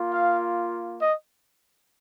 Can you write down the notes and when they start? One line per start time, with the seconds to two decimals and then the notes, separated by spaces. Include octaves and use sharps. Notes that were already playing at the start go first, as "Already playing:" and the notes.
Already playing: A#3 F4
0.11 F5
0.99 D#5